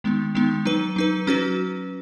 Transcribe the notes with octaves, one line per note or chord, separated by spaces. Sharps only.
D#3 G#3 B3 D#4
D#3 G#3 B3 D#4
F#3 D#4 B4
F#3 D#4 B4
F#3 C#4 F#4 B4